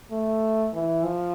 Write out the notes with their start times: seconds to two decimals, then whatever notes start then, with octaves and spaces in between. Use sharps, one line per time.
0.11 A3
0.74 E3
1.04 F3